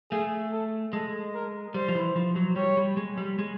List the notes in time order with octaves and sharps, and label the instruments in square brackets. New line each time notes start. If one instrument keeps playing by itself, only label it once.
[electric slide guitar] A3 [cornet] G#4
[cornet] A4
[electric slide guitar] G#3 [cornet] A4
[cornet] A#4
[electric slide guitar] G3 [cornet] C5
[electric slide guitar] F3
E3
F3
F#3
[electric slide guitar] G3 [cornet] C#5
[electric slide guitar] G3
G#3
G3
G#3